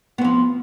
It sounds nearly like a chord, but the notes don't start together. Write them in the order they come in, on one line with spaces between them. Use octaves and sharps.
B3 C4 F3